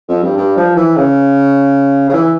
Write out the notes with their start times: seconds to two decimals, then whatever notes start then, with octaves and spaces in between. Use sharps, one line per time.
0.08 F2
0.23 G2
0.37 G2
0.57 F3
0.76 E3
0.96 C#3
2.09 C#3
2.13 E3